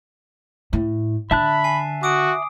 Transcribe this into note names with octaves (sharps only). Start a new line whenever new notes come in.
A2
D3 E5 A5 B5 F#6
G#5 C7
F#4 D6 D#6 D7